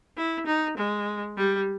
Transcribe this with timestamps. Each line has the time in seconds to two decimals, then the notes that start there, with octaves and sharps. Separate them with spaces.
0.17 E4
0.46 D#4
0.77 G#3
1.37 G3